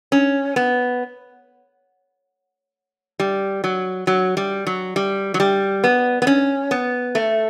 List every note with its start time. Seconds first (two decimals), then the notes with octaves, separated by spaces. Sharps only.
0.12 C#4
0.56 B3
3.20 G3
3.64 F#3
4.07 F#3
4.37 G3
4.67 F#3
4.96 G3
5.34 F#3
5.40 G3
5.84 B3
6.22 B3
6.27 C#4
6.71 B3
7.15 A3